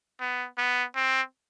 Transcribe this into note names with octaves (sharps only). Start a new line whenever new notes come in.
B3
B3
C4